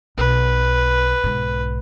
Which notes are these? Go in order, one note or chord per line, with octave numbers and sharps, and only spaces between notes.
B1 B4
B1 G#2